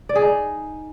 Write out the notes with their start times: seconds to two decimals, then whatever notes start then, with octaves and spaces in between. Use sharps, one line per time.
0.09 D5
0.16 G#4
0.22 D#4